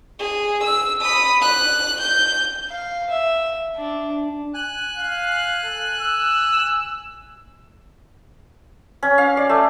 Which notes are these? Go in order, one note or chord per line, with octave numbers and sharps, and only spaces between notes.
G#4
E6
B5 D#6
F#6
G6
F5
E5
D4
G#5 F#6
F5
A4
E6
C#4
F5
D5
A3